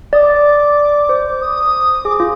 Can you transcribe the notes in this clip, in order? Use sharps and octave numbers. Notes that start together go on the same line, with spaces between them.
D5 D#6
D6
C5
D#6
G#4 D6
F4